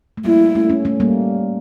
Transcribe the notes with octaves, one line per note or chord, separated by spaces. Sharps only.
A3
G3 A#3 E4
A3 C#4
A3 C#4
A3 C#4
G3 A#3